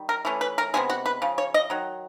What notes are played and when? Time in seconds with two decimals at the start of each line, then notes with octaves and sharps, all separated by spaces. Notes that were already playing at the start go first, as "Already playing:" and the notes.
Already playing: D#3 G3
0.09 A#4
0.25 E3 A3 C#4
0.41 B4
0.58 A#4
0.74 C3 D#3 G#3 B3 G#4
0.90 F#4
1.06 B4
1.22 C#3 F3
1.38 C#5
1.54 D#5
1.70 D#3 F#3